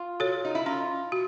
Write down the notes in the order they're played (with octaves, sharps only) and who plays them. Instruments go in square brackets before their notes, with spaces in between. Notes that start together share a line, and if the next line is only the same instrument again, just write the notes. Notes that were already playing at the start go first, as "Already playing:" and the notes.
Already playing: [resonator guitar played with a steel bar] F4
[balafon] F#4 A4 C#5
[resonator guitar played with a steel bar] D#4
E4
[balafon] C#4 [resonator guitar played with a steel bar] F4
[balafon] F#4